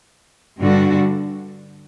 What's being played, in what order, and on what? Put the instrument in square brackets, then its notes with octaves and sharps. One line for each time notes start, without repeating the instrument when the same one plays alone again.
[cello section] G2 D3 G3 D4 F#4